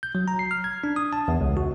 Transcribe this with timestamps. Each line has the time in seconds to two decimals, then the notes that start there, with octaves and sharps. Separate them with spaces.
0.03 G6
0.15 F#3
0.28 A#5
0.39 C7
0.51 F6
0.64 G#6
0.84 D4
0.96 D#6
1.13 A5
1.28 E2
1.41 C#2
1.57 F#4